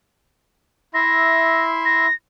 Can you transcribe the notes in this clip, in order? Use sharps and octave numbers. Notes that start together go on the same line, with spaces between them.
E4 E5 C6 A#6
A#6